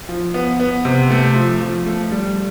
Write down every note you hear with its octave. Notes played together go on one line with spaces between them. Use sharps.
F3
B3
B3
C3
A3
F3
F3
A3
G3